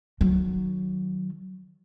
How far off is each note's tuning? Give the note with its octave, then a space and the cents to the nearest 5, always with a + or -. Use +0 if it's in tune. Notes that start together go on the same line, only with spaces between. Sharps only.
D#3 -10 F#3 +0